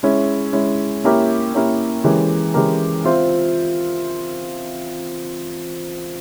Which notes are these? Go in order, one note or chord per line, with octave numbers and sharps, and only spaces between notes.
G#3 C#4 E4
G#3 C#4 E4
A#3 C#4 E4 G4 A#4
A#3 C#4 E4 G4 A#4
E3 G#3 C#4 G4 A#4
E3 G#3 C#4 G4 A#4
C4 F4 C5 E5